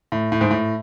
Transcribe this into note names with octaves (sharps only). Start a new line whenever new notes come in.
A2
A2
G#2
A2